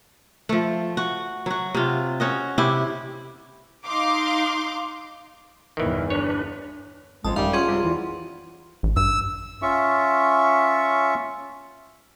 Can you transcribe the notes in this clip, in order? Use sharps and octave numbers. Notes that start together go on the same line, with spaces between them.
F3 A3
F#4
F#3 F#4
C3 F4
C#4 F#4 D#5
C3 E4 G4
D#4 F5 C6 D6
G1 E2 D#3 E3
D4 B4 C#5
A1 F2 G#3 A5 D#6
F#2 D#3 G3 F5
C#4 F4 G#4 F#5 C6
C3 G3
E2 E3
A1
G2 E6
C#4 F4 E5 C#6